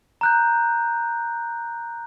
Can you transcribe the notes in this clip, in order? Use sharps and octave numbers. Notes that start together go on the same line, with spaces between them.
A#5 F#6 G6